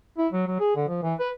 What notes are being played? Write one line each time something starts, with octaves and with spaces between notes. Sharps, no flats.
E4
F#3
F#3
G#4
D3
F3
E3
B4